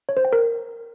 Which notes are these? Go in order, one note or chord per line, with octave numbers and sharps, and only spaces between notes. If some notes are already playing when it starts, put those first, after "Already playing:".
C#5
C5
G5
A#4